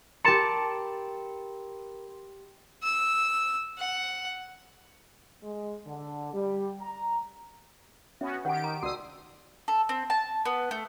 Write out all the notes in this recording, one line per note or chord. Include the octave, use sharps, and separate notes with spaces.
G4 A#4 A5 B5 C6 C#7
E6
F#5
G#3
D3
G3
A#5
B3 C#4 F#4 E5
D#3 G4 C#5 F#5 D7
A#5
C#2 F#4 D5 D#6 E6 C7
A4
C4
A5
B3
A3